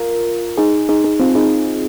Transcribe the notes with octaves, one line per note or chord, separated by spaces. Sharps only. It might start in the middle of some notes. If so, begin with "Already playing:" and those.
Already playing: F4 A#4
D#4 G#4
D#4 G#4
D#4 G#4
C4 F4
D#4 G#4